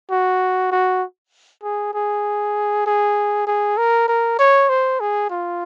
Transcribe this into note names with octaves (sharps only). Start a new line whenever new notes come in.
F#4
F#4
G#4
G#4
G#4
G#4
A#4
A#4
C#5
C5
G#4
F4